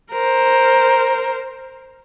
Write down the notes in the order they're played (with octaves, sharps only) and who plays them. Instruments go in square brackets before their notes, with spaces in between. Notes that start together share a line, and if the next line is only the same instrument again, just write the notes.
[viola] A#4 C5